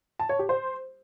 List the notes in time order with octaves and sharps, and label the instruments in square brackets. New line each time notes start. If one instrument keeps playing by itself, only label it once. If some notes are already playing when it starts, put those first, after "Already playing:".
[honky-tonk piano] A5
C#5
G4
C5